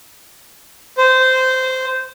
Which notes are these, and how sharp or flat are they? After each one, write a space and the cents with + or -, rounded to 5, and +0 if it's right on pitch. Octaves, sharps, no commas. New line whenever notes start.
C5 -15